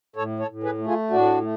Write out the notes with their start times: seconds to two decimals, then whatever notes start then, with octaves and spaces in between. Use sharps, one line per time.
0.16 A2 A4 C#5
0.39 A4 C#5
0.48 A2
0.63 G#4 B4
0.78 A3
0.87 F4 G#4
1.10 A2 D4 F#4
1.41 A3